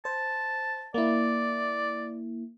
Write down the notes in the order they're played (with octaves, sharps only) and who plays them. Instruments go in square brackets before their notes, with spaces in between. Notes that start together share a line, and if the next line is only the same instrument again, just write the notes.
[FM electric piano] C5 [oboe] A5
[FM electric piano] A#3 E4 [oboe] D5